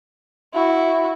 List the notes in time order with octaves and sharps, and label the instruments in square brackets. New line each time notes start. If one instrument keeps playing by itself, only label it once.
[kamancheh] E4 F#4